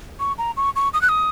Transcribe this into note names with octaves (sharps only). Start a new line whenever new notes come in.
C#6
A#5
C#6
C#6
D#6
F#6
D#6